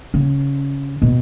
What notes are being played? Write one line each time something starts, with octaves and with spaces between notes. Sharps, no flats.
C#3
B2